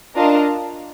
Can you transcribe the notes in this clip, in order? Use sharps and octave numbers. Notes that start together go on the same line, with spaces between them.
D4 F4 A#4 D#5 A5